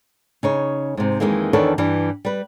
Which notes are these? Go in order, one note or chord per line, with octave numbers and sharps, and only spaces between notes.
C#3 D#4 C#5
G#2 C3
F2 B2 D#3 E3 G#3 A#3
E2 D#3 D4 A4 B4 C#5
G2 E3 G3
G3 B4